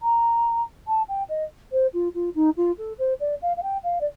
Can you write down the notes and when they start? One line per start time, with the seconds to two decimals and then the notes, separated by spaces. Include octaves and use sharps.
0.02 A#5
0.88 A5
1.09 G5
1.29 D#5
1.72 C5
1.93 F4
2.15 F4
2.35 D#4
2.57 F4
2.78 A4
2.99 C5
3.20 D5
3.42 F5
3.57 F5
3.63 G5
3.84 F5
4.01 D5